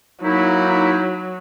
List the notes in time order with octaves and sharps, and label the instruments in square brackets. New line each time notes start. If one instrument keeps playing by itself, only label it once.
[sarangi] F#3 [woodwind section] A#3 D#4 E4